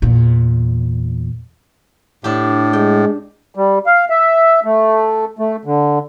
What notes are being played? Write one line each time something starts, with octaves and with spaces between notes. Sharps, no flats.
E2 A#2
A2 D4 G4
G#3 G5
G3
F5
E5
A3
A3
D3